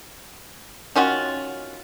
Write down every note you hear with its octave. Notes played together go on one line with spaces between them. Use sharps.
D#3 C#4 F4 F#4